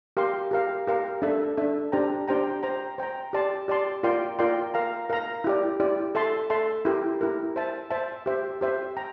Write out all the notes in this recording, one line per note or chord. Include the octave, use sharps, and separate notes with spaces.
G4 A#4 F5 C6
G4 A#4 F5
G4 A#4 F5
D4 A4 E5
D4 A4 E5
D4 G4 C5 G5 A#5
D4 G4 C5 G5 A#5
C5 G5 A#5
C5 G5 A#5
G4 D5 A5 C6
G4 D5 A5 C6
F4 A#4 D5 G5 C6
F4 A#4 D5 G5 C6
A#4 F5 A#5
A#4 F5 A#5
E4 G4 D5
E4 G4 D5
A4 E5 A5 C6
A4 E5 A5 C6
E4 G4 A#4
E4 G4 A#4
C5 E5 A5
C5 E5 A5
G4 C5 E5
G4 C5 E5
G5 A#5